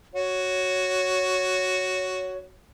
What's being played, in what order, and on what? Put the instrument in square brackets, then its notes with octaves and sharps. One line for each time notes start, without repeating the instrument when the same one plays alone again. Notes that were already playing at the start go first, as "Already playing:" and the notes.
[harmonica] F#4 [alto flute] C#5